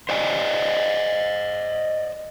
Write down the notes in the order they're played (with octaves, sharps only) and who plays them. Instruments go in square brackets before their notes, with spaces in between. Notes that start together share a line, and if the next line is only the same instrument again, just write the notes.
[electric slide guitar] C5 D5 D#5 G#5